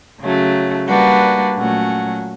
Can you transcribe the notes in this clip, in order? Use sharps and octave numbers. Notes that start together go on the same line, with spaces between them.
C#3 F#3 A3
G3 A#3 D4 F#4 B4
A#2 F#3 A3 C#4 F#4